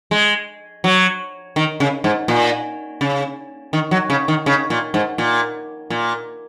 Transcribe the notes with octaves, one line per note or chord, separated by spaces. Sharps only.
G#3
F#3
D#3
C#3
G#2
A#2
C#3
D#3
F#3
C#3
D#3
C#3
A#2
G#2
A#2
A#2